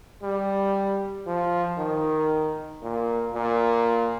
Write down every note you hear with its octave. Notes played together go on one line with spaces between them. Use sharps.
G3
F3
D#3
A#2
A#2